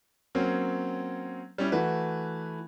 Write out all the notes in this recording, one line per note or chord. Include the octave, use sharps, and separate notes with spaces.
F#3 A#3 C4 C#4
G3 C#4 E4
E3 A3 F#4 B4